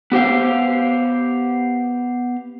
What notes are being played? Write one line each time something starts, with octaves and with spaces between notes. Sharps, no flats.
B3 G4 C5 F5